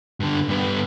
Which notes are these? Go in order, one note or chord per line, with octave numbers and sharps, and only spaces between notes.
G2 D3
G2 B3